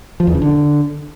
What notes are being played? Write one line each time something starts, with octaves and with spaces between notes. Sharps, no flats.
F3
E2
C#3
D3